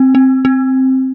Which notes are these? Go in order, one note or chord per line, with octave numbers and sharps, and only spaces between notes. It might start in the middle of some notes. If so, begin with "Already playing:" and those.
Already playing: C4
C4
C4